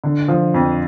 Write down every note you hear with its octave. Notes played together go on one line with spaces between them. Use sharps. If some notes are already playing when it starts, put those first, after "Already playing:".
D3
F3
F2